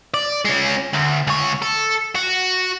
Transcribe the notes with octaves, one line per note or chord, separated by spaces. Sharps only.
D5
G#3 C#4
D2
C#2 C#5
A4
F#4